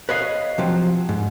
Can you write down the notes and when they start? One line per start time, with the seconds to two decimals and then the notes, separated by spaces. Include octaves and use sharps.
0.09 B4 C#5 D#5 F5
0.58 C3 F3 F#3
1.09 G#2